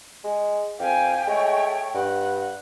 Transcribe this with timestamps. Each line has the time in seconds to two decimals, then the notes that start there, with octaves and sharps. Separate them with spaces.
0.24 G#3
0.80 F2 F5 G5 G#5
1.27 G#3 A3 C#5
1.94 G2 F#5